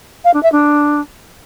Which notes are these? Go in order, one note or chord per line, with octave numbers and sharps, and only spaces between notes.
F5
D4
E5
D4